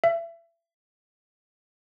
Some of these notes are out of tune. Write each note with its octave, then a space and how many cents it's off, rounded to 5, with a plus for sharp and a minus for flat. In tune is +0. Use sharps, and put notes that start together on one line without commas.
E5 +30